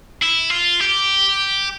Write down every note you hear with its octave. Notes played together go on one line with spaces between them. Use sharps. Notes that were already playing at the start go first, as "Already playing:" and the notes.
E4
F4
G4